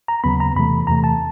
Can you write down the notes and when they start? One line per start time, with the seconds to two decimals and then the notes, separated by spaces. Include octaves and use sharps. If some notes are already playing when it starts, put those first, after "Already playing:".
0.08 A#5
0.24 D#2 C#3 F#3 B3 B5
0.40 A#5
0.56 E2 C3 E3 A3 B5
0.87 E2 C3 E3 A3 A#5
1.04 A5